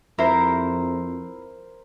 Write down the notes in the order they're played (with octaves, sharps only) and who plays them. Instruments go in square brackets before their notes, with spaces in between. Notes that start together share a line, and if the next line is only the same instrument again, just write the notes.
[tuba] F2 [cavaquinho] E4 [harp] A#4 C5